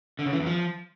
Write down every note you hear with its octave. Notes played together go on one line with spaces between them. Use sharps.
D3
C#3
E3
E2
F3